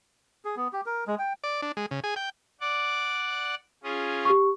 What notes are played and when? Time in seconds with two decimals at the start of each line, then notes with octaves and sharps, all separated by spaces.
0.45 G#4
0.56 B3
0.73 G4
0.86 A#4
1.07 G#3
1.19 G5
1.44 D5
1.62 D4
1.77 G#3
1.91 C#3
2.04 G#4
2.16 G5
2.60 D5 F#5 D6
3.83 C#4 F4 G#4
4.25 G4 C#6